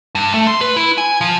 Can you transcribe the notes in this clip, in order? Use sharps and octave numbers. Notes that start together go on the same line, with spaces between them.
G2
A3
C6
B4
E4
G#5
F3